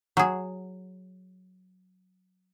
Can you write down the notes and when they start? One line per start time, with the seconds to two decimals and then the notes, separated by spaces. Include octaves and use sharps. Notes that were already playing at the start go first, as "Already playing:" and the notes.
0.17 F#3 G#4